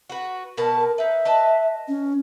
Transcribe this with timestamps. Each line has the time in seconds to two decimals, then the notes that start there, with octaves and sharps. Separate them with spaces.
0.10 F#4 B4
0.57 B2 A#4 B4 A5
0.79 A#4
0.98 D#4 B4 E5
1.25 B4 D#5 A5
1.88 C#4